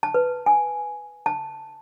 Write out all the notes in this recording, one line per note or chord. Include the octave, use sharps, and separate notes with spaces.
A5
B4
G#5
A5